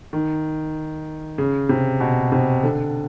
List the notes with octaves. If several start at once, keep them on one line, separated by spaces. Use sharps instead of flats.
D#3
C#3
C3
B2
C3
D3